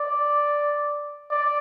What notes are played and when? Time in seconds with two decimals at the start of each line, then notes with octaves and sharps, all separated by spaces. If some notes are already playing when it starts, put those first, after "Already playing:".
Already playing: D5
1.31 D5